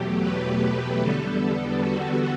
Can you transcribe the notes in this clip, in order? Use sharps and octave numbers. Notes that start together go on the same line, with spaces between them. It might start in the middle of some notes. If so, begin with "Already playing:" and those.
Already playing: E2 B2 F#3 A3 G4
B4
E2 D3 G3 B3 A4
F#4